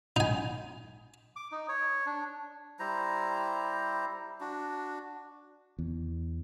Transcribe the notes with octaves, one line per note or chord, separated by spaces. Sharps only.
D#4 G#5
D6
D#4
C#5
D4
G3 E4 C5 A#5
D4 F#4
E2